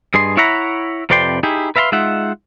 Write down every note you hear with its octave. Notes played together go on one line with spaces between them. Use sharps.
G2 G#4 D#5 C6
E4 C#5 E5 F#5 A#5 B5
F2 C3 B4 D5 G5 C6
D#4 E4 G4 G#4
B4 E5 F5 A#5 C6
G#3 D#4 F4 E5 F#5